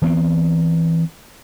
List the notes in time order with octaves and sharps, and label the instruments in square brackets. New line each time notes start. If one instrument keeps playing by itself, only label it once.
[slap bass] E3 B3 C4